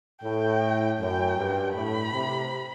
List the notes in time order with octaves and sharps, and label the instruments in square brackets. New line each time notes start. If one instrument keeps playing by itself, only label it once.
[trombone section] A2 [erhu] G5
[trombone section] F#2 [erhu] G5
[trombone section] G2
[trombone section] A2 [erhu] B5
[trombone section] C3